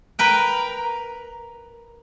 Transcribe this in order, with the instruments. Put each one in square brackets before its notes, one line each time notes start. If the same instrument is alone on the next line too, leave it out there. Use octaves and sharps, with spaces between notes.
[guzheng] A#4 B4 G5